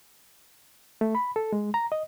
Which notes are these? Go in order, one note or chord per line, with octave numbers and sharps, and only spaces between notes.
A3
B5
A4
G#3
A#5
D#5